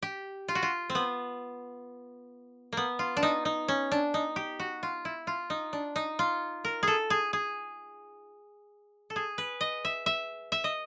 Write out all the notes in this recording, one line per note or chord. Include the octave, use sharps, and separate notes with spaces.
G4
F4
F#4
F4
C4
B3
A#3 B3
F4
D4
D#4
D#4
C#4
D4
D#4
G4
F#4
F4
E4
F4
D#4
D4
D#4
F4
A#4
G#4 A4
G#4
G#4
A4
G#4
B4
D#5
E5
E5
E5
D#5